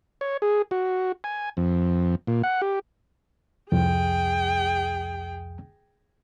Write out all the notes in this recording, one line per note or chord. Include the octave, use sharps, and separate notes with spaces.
C#5
G#4
F#4
G#5
F2
A#2
F#5
G4
C2 F2 G#4 G5